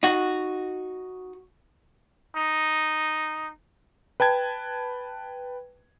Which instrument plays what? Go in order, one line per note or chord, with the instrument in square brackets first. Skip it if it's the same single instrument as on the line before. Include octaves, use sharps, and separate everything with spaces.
[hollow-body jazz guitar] D#4 F#4
[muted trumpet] D#4
[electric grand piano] B4 G5 A5 G#6